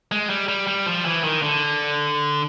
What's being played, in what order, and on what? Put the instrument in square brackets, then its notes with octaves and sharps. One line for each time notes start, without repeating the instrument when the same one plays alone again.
[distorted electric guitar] G#3
G3
G3
G3
F3
E3
D#3
D3